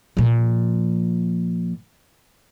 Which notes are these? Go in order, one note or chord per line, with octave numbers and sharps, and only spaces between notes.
A#2 F3